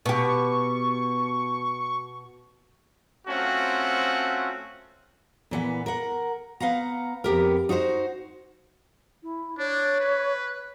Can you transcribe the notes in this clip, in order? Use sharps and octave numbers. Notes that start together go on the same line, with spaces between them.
B2 G4 C#6
A3 C4 C#4 F4 F#4
A#2 E3 B3
A#4 F#5
B3 F5 F#5 A#5
F2 B3 G4 A#4
D#4 F#4 G#4 C5
E4
D4 C#5
B4